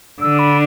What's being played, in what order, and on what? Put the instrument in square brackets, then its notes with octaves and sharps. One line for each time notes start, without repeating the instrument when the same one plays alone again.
[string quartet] D3 [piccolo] E6
[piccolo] B5